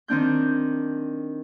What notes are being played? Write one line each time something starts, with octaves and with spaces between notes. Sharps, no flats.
D#3 C4 D4 G6